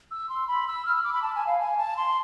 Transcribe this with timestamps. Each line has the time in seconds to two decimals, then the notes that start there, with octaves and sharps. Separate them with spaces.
0.11 E6
0.29 C6
0.48 B5
0.67 E6
0.86 F6
0.95 E6
1.04 D6
1.13 B5
1.22 A5
1.35 G#5
1.47 F5
1.60 G#5
1.78 A5
1.97 C6